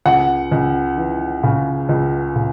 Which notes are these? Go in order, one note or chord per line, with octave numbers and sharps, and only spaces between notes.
C#2 F#5
C#2
E3
C#3
C#2
C#3